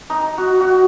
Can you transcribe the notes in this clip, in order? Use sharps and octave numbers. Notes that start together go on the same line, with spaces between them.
D#4
F#4
F#4